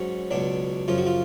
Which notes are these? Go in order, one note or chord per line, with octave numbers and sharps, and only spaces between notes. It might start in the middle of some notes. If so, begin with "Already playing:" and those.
Already playing: G#2 F#3 C#4
C#2 B2 F#3 D4
F#2 C#3 F3 F4
F#4
F4